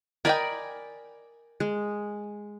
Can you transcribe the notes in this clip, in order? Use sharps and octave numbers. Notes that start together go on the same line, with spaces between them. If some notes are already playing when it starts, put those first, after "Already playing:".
A#4 D5 D#5 G5 G#5 B5
G#3